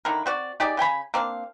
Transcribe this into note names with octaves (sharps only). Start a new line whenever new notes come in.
D3 D#3 E4 A#4
C4 F#4 D5
D#4 G4 G#4 D5
C#3 G5 G#5 B5
A#3 C4 D4 F5